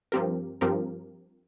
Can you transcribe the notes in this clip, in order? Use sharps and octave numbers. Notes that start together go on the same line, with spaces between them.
G2 F3 C4 G4 A#4
G2 F3 C4 G4 A#4